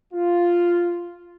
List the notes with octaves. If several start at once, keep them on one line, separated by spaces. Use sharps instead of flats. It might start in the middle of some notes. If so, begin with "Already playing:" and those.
F4